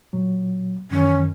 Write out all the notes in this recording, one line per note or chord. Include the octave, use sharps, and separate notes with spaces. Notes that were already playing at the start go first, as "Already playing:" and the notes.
A#2 F#3
F#2 D#3 E3 C#4